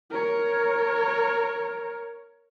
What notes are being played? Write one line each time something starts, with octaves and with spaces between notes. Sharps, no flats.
A#4 C#5